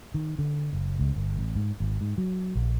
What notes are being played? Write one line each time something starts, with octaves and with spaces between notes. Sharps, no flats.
D#3
D3
F#1
C#2
G1
A1
G#2
G#1
G#2
F#3
A#1